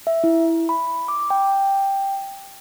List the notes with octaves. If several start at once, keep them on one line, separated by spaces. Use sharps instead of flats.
E5
E4
B5
D6
G5